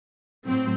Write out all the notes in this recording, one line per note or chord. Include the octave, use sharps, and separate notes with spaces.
A2 F#3 C4